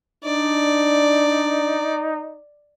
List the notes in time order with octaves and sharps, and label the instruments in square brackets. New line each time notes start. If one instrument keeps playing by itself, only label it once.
[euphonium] D4 [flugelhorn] D#4 [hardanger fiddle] D5